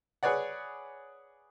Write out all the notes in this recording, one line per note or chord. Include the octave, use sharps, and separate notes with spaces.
G#4 B4 C#5 D5 F#5